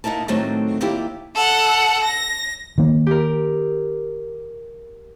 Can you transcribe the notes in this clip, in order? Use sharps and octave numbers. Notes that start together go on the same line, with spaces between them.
A#2 D#4 E4 A#4 A5
A2 D3 D#3 F#3 A3 C4
D#2 A#3 E4 F4 G4 G5
A4 F#5
A#6
D#3 A#3
G4 A#4